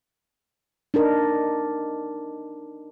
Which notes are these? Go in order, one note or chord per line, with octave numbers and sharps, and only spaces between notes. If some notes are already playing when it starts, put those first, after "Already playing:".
D4 D#4 A#4